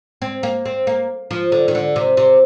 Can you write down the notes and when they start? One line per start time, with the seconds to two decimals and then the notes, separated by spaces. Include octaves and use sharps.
0.22 C4
0.43 A#3
0.65 C4
0.87 A#3
1.31 F3
1.52 D3
1.68 D#3
1.75 D3
1.96 C3
2.17 C3